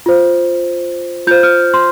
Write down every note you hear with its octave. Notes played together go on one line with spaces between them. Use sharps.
F4 C5
F4 C5 G6
F6
C6